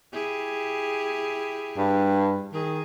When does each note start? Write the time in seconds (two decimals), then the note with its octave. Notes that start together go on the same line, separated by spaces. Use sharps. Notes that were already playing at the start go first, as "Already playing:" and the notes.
0.13 E4 G4 G#4
1.77 G2
2.53 D#3 G#4